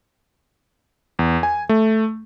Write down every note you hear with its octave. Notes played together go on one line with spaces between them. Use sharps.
E2
G#5
A3